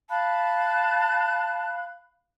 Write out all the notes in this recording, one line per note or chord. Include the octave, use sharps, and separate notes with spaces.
F5 A5 B5 F#6